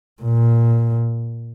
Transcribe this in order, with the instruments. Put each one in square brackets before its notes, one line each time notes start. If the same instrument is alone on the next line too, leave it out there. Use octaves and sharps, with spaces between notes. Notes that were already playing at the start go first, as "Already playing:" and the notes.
[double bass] A#2